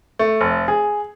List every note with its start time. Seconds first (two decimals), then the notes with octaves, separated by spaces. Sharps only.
0.19 A3
0.41 F1
0.68 G#4